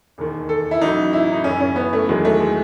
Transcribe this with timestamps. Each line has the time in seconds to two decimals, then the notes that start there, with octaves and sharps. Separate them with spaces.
0.18 E1 D#2 D#3
0.49 A4
0.71 E4
0.81 A1 A2 F#3 D#4
1.13 E4
1.32 D#4
1.44 F#1 F#2 E3 C#4
1.60 C#4
1.76 B3
1.93 A3
2.09 E2 D#3 F#3 G#3
2.25 A3
2.40 G#3